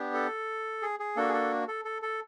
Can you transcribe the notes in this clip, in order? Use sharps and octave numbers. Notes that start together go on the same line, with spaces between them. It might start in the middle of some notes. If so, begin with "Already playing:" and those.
Already playing: B3 D4 G4
A4
G#4
G#4
A#3 D4 F#4 A4
G#4
A4
A4
A4
A4